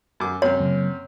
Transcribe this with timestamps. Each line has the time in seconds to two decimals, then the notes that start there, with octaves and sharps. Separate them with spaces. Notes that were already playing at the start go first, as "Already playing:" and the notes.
0.20 F#2 D6
0.42 F#2 C3 C#5
0.59 C#3 F#3 A#3